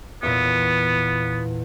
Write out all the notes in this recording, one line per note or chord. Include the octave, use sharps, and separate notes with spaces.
E2 A#2 B3